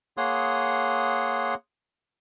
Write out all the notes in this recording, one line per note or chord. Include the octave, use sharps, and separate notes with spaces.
A#3 G#4 C#5 F#5 C6 D#6